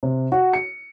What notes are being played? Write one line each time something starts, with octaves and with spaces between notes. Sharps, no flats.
C3
F#4
C#7